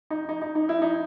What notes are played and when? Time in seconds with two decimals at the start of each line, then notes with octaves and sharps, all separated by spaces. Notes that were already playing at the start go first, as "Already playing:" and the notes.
0.11 D#4
0.29 D#4
0.42 D#4
0.55 D#4
0.69 E4
0.82 D#4